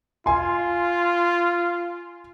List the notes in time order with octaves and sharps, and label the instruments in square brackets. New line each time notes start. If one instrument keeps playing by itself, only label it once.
[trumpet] F4 [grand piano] G#5 C6